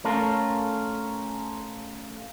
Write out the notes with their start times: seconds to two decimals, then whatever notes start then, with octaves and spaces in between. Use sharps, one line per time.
0.05 A3 C#4 F4 A4 A#4